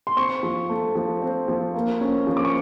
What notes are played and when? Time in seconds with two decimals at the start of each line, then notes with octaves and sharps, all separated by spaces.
0.07 C6
0.17 C4 C#6
0.43 F3
0.69 A3
0.95 F3
1.22 C4
1.48 F3
1.74 A#3
2.00 C#4
2.27 F3
2.37 D6
2.45 C#6